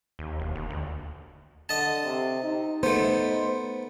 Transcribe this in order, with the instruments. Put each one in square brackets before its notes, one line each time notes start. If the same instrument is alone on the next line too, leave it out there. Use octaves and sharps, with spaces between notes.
[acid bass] D#2
E1
D#2
D2
[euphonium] D3 [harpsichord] D#5 A5
[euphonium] C3
D#4
[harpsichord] A3 B3 [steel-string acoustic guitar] C5